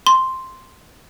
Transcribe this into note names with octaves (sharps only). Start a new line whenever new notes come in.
C6